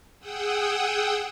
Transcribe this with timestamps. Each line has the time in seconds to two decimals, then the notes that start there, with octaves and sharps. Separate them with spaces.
0.20 G#4 F#5 G5 D#6 E6